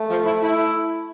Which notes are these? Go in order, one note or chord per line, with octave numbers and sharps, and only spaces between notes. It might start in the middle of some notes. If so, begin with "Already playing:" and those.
Already playing: A3
F3
E4
E4